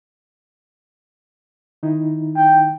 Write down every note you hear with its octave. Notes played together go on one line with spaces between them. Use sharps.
D#3 D#4 E4
G5